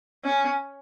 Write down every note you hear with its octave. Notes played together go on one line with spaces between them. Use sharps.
C#4